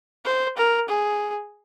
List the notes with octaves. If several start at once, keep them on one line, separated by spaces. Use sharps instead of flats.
C5
A#4
G#4